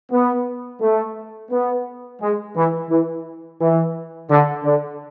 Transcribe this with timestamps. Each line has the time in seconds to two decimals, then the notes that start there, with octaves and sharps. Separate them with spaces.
0.11 B3
0.81 A3
1.51 B3
2.21 G#3
2.56 E3
2.90 E3
3.61 E3
4.30 D3
4.64 D3